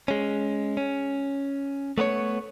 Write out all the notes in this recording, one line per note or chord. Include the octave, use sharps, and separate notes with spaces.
G#3 C#4
C#4
A3 B3 B4 C#5